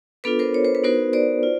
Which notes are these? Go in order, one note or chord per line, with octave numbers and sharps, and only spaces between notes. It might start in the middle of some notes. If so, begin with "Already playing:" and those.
B3 D4 F4 A4 B4
A#4 C5
C#5
C5
B4
B3 D#4 F#4 A#4 C5
C5 D5
F4